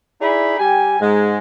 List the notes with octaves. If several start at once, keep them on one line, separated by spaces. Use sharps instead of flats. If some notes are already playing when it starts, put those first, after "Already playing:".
D#4 E4 G#4 D5 B5
G3 G4 G#5
G#2 G#3